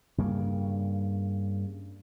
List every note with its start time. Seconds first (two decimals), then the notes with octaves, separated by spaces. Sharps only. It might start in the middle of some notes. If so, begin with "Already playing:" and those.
0.18 G2 C#3 A#3